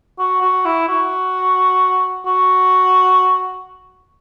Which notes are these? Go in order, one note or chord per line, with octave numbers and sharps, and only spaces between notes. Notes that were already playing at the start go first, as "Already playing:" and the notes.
F#4
F#4
E4
F#4
F#4